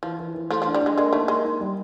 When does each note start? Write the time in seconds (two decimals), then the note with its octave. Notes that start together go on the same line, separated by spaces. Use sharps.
0.03 E3 F3
0.19 E3
0.34 E3
0.50 F3 A3
0.62 F3 D4
0.74 G3
0.81 G#3 D4
0.97 G#3 A#3
1.13 A3 D#4
1.28 G#3 A#3
1.45 D#4
1.60 G3